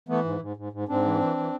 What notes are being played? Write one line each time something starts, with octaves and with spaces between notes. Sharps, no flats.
E3 A3 B3
G#2
G#2
G#2
G#2
G#2 C4 D4
E3
E3
E3